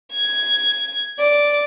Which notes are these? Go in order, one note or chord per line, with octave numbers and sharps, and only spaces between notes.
G#6
D5